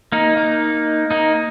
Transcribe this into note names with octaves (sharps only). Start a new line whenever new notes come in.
A#3 D#4
A#3 D#4
A#3 D#4